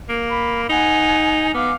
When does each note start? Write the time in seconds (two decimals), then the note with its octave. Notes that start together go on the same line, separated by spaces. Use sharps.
0.09 A#3
0.30 B5
0.70 D#4 F#5 G#5
1.54 B3 F5 D6 F6